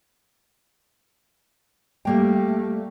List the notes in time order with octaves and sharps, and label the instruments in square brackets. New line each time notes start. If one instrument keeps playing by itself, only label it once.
[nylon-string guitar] G3 A#3 G5 [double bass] A3